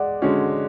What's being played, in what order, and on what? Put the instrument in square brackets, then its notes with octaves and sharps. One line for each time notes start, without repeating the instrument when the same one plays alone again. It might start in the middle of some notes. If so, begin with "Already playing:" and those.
Already playing: [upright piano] G#3 [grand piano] D5 F#5
[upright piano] D3 G#3 C#4 F#4